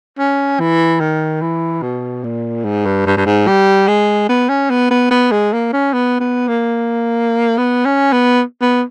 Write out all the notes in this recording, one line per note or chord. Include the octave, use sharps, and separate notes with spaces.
C#4
E3
D#3
E3
B2
A#2
G#2
G2
G2
G2
G#2
G3
G#3
B3
C#4
B3
B3
B3
G#3
A#3
C#4
B3
B3
A#3
B3
C#4
B3
B3